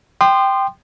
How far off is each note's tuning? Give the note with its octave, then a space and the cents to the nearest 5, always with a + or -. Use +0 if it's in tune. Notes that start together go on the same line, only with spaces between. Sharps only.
G5 +0 C6 -10 D#6 -45